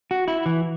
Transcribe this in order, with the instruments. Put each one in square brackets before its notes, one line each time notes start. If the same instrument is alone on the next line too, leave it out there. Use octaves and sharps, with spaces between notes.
[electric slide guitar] F#4
E4
E3